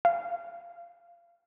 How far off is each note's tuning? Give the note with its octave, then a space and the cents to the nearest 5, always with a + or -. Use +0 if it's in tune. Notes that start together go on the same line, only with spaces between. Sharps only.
F5 -20